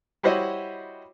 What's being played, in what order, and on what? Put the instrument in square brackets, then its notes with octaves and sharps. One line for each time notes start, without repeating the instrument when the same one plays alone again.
[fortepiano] G3 E4 F#4 C5 C#5 D#5